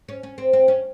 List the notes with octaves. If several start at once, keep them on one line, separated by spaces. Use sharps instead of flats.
C#4
C#4
C4
C4
C#4